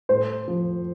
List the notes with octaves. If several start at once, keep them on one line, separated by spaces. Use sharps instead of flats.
A2 C5
F3